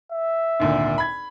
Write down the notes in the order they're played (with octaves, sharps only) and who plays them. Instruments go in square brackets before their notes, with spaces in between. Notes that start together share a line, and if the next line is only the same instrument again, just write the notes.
[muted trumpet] E5
[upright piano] G#1 D2 A#2
B5 G#6